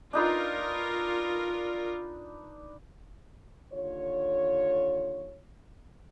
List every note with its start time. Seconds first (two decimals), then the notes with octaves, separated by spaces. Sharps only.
0.13 D4 D#4 F4 A#4 B4
3.73 D#2 D3 F4 C#5